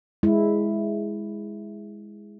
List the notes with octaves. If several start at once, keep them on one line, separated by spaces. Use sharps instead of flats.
G#3 E4